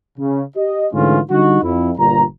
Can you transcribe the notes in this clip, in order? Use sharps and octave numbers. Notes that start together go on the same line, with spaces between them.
C#3
G4 D#5
G#2 D3 E3 A3 C#4 F4
D3 G3 D#4 F#4
F2 E4
G1 A#2 A#5